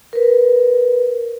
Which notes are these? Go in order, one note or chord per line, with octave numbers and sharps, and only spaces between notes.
A#4 B4